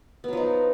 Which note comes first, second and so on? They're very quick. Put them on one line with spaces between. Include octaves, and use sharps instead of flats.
B3 F#3 F3 D#4